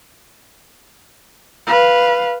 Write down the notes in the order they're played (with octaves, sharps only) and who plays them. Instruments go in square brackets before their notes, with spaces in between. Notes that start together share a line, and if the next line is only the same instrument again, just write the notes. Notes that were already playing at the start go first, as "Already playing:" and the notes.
[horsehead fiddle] B4 F5